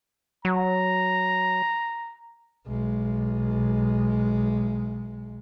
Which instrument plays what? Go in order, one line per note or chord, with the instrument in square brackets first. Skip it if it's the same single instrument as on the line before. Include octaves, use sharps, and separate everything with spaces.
[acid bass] F#3 [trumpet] A#5
[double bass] B1 G#3